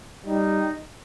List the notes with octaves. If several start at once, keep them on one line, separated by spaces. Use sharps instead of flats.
G3 D#4